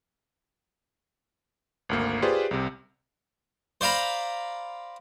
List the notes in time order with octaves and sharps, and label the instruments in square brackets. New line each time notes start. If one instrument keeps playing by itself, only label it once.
[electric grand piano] G#1 D2 A#3
F4 G4 G#4 B4 C5 D5
C2 C3
[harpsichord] C5 D5 F5 A#5 B5